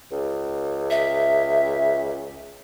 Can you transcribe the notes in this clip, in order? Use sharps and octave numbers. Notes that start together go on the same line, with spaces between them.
C#2
E5